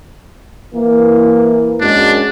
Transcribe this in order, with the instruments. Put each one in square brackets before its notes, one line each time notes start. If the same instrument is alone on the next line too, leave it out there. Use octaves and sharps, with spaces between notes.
[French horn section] E3 A#3
[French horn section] F#2 G#3 [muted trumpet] D4